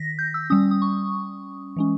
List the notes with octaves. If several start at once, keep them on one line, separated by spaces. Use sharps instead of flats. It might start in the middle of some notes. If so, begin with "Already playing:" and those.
Already playing: D#3 A#6 B6
G6
E6
G3 C#4 D#6
D#6
C#6
E3 G#3 C#4